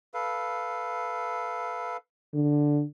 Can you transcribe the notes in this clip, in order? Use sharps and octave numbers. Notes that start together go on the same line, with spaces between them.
A4 B4 F5
D3